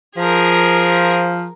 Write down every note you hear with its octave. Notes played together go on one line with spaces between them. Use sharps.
F3 G#4 A#4